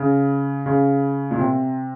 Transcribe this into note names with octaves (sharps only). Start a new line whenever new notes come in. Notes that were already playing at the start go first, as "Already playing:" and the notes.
Already playing: C#3
C#3
A#2
C3